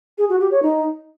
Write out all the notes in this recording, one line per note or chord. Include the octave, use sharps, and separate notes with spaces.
G#4
F#4
G4
C#5
D#4